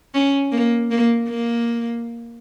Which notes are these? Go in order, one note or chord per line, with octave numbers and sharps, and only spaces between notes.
C#4
A#3
A#3
A#3